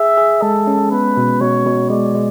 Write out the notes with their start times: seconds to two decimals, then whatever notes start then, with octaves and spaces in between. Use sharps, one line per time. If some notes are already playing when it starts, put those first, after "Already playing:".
Already playing: G#4 E5
0.18 G#4
0.42 G#3 A4
0.67 C#4
0.91 B3 B4
1.17 B2
1.41 B2 C#5
1.66 B2
1.90 G#3 D5
2.15 G#3